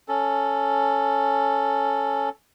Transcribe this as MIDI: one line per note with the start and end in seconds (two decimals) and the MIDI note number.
0.08 2.29 61
0.08 2.29 69